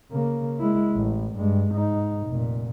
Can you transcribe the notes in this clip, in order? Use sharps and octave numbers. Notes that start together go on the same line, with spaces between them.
C#3 A#3
G#3 E4
A1
G2 G#3
G#2 D#4
F1 A#2